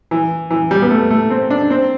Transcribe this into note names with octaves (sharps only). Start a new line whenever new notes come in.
E3
E3
G3
B3
A3
A3
C4
D4
C4